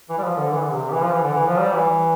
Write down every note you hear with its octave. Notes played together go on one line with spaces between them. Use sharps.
E3
G3
F3
D3
E3
D3
C3
E3
F3
E3
D3
E3
F3
G3
E3